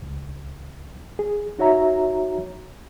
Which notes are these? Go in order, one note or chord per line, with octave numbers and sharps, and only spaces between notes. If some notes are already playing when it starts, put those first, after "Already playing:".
C#2
G#4
D#4 F#4 C#5 E5 A#5